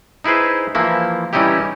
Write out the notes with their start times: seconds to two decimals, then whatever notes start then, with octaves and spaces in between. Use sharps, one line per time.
0.24 D#4 E4 G#4 B4 C5
0.75 E3 F3 A#3 E4
1.33 E3 G3 C#4 D#4 E4 G4